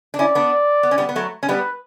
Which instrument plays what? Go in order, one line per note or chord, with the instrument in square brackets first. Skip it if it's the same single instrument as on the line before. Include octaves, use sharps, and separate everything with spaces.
[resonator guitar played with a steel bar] D4
[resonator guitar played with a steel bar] C#4 E4 [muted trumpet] D5
[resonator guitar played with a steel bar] B3 D4
B3
C#4
G3 B3
B3
F#3 A3
C#4
[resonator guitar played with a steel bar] G3 B3 [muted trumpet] B4